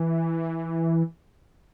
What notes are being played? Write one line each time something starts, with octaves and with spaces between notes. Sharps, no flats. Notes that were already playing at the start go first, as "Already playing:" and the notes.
Already playing: E3